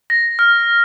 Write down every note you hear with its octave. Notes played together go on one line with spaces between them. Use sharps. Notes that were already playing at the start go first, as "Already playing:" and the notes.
A#6
F6